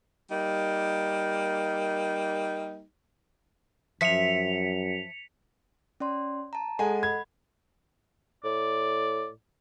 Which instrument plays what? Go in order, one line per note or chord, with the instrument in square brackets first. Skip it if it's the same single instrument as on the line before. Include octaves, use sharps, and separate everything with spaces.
[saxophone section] G3 A#3 D#4
[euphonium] F#2 [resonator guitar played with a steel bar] F3 E5 [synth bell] B6 C#7 F7
[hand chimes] C#4 D5 C6
A5 A#5
[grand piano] G#3 G#5 [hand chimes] A4 D#5 F#5
[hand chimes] B5 [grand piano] G#6
[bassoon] A2 [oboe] D5